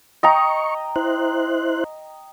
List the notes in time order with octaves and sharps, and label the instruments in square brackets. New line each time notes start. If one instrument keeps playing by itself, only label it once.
[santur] D#5 G5 A#5 [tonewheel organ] C#6
[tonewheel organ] E4 C5 F#6